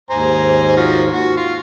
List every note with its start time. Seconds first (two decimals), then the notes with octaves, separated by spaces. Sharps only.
0.10 D#2 G#2 C5 G#5 A#5
0.77 F3 F#4
1.12 F#4
1.37 F4